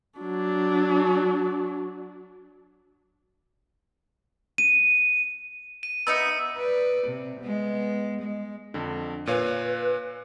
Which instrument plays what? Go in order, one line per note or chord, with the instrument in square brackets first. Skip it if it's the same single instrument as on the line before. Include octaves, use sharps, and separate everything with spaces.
[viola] F#3 D4
[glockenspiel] D#7
[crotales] D#7
[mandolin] B3 D#4 E5 [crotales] E6 C#7
[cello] B4 D5
C3
G#3 B3
G#3
[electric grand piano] F2 D3
[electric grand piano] A#2 C#5 F5 [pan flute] B4